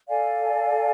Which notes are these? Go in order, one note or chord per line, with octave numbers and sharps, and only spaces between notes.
A4 D5 F5 G#5